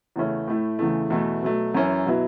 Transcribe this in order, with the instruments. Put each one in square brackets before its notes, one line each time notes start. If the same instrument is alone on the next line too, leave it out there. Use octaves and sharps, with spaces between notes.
[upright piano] E2 C#3 A3 C#4 E4
A2 A3 E4
E2 C#3 E3 A3
E2 B2 A3 E4
B2 F#3 A3
F#2 E3 C#4 E4
B2 F#3 B3 E4